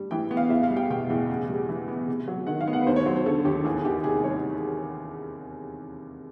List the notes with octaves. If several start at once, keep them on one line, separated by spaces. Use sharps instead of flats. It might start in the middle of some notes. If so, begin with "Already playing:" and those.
Already playing: G2 G3
E3 G5
B3
F5
E2 E5
F5
G3
G5
B2 G5
E2
C#3
G3
E3
B3
C3
F#3
D#3 F#5
F5
B3
F#5
B4
D#2 C5
C#5
F#3 C5
C5
D3 A4
D#2 G4
E2 G#4
D#3 G4
C3 G#4
G3 C#5